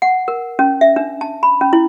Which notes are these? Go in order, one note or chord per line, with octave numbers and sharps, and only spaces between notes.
F#5
A#4
C#4
E5
D4
A5
B5
C#4
E4